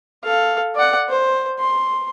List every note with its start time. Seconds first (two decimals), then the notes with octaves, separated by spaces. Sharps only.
0.24 A4 F5
0.75 D5 F#5
1.09 C5
1.59 C6